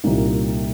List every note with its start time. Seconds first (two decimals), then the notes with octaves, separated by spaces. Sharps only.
0.04 C2 A#2 G3 A#3 D#4